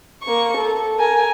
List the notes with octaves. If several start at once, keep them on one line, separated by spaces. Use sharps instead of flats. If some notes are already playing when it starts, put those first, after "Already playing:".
A#3 C#6
A4
A#4 G#5